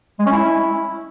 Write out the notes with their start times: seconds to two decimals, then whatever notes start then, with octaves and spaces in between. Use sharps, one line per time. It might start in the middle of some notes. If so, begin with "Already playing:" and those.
0.19 G#3
0.26 C#4
0.32 E4